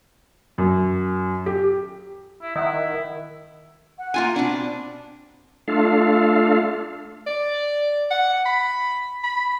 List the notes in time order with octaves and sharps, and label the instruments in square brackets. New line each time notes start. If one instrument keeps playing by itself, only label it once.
[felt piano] F#2
G4
[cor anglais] E4
[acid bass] D#3 [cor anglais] E4 [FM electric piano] D#5 E5 F#5
[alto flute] F#5
[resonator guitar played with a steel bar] A#3 F4 G#5
[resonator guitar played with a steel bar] B2 D4 [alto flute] C4
[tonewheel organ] A3 D4 F4 A4 F5
[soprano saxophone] D5
F#5
B5
B5